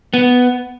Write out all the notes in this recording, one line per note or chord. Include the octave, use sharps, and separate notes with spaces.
B3